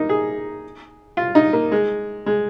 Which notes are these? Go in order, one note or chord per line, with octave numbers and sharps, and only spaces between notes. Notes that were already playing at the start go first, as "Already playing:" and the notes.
Already playing: A#3 D#4
G#4
F4
D#4
A#3
G#3
G#3